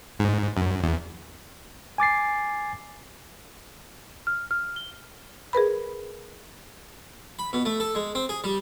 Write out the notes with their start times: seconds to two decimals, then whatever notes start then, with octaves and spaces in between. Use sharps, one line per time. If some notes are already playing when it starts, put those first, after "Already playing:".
0.19 G#2
0.57 F#2
0.83 E2
1.98 G#5 D6 A6 C7
4.27 F6
4.51 F6
4.76 G7
5.53 G#4 A#4 B4 B5
7.39 B5
7.53 B2
7.65 A3
7.80 A4
7.95 G#3
8.15 C4
8.29 G#4
8.44 G3